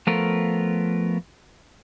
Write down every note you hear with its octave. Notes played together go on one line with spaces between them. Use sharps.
F3 A3 B3 F4 A4 A#4